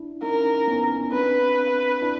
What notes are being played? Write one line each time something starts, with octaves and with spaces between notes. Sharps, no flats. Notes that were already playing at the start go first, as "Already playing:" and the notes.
Already playing: D4 E4
C#4 D#4 A#4
B3 C#4
C4 D4 B4
D4 E4